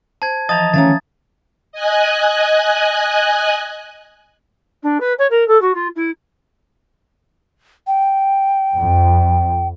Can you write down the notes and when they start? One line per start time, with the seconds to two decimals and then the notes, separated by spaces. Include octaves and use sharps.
0.22 C5 A5 G#6
0.49 E3 F3 D#5 A5 A#5 D#6 A6
0.74 D#3 E3 A3 C#4 E5 F5 A#5 A6
1.72 D#5 G#5 F#6
4.82 D4
5.00 B4
5.18 C#5
5.30 A#4
5.47 A4
5.61 F#4
5.74 F4
5.95 E4
7.87 G5
8.74 F2